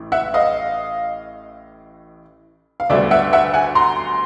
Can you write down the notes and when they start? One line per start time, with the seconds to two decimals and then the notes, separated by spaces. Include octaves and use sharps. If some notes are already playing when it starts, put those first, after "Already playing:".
Already playing: A1 A2 E3
0.12 E5 F#5
0.34 D#5 F5
2.80 F5
2.90 D2 D3 G3 B3 D5 E5
3.11 E5 F#5
3.33 E5 F#5
3.54 F#5 G#5
3.75 A#5 C6